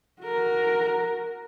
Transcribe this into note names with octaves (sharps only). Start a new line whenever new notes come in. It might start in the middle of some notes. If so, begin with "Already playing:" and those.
F#4 A#4